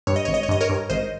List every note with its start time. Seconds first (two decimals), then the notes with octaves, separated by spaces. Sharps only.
0.07 G2 C#5
0.16 D#5
0.25 G#1 C#5
0.34 D#5
0.43 C#5
0.49 G2 D#5
0.61 A#4 C#5
0.69 G2
0.90 G#1 C5 D#5